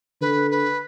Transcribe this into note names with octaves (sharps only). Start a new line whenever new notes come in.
D3 B4
B4